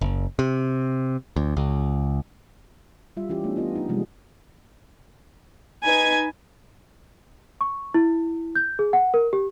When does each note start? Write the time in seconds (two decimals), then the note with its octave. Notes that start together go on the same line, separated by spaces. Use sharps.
0.01 F#1
0.39 C3
1.36 D2
1.57 C#2
3.17 G3 F4 E5
3.29 E3 C#4 F4 G4
3.44 A3 B3 D4
3.56 B3 F4 D#5
3.76 D#4
3.89 C3 F3 G3 G#3 A#3 C4
5.83 D#4 B4 G#5 G#6
7.61 C#6
7.94 E4
8.55 G6
8.79 G#4
8.93 F#5
9.14 A#4
9.33 G4